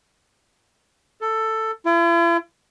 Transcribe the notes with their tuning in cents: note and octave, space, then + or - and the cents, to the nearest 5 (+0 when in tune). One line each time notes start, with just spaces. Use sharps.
A4 +10
E4 +45